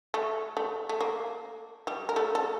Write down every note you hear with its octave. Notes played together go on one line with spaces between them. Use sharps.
A3
A3
A3
A#3
G3 G4
A#4
A3 A4
A4